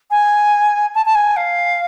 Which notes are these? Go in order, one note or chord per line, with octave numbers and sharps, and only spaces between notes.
G#5
A5
A5
G#5
F5